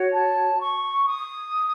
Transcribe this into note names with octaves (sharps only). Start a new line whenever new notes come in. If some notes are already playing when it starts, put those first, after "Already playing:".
Already playing: F#4 C#5
A5
C#6
D#6